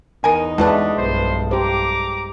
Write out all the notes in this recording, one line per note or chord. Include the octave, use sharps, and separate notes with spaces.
E2 D#4 A#4 G#5
B2 G#3 A3 D4 E4 B4
B1 G2 C5
G4 C5 A#5 D6